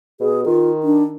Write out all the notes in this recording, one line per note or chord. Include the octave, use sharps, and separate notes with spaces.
B2 G#4
D#3 F4
D4